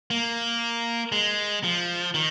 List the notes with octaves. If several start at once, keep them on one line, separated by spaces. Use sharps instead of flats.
A#3
G#3
F3
D#3